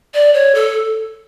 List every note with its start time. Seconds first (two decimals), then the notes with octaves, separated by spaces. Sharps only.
0.14 D5
0.34 C#5
0.55 A4